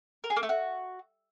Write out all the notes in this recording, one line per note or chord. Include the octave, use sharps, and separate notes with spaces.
A#4
G#4
A#3
A3
F#4